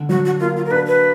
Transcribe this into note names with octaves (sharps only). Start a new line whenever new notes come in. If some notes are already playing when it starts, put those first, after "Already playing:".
Already playing: D3
F#3 F#4
F#4
A#3 F4
F4
A#4
D4 B4
B4